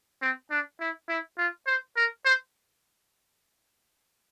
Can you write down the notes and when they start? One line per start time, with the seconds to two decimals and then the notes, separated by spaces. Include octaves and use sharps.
0.22 C4
0.51 D4
0.81 E4
1.09 E4
1.38 F4
1.67 C5
1.97 A#4
2.25 C5